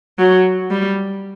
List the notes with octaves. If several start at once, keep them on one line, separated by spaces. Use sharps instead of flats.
F#3
G3